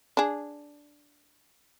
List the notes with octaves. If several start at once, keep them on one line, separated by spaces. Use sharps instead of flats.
D4 G#4